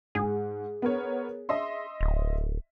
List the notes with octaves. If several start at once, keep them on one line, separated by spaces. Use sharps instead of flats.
G#2 G#4
B3 A#4 C#5
D#5 E5 C6
D1